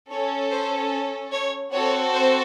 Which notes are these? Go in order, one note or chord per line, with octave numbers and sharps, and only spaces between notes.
C#4 A4 C#5
C5
C#5
C4 F#4 A4 C#5
C5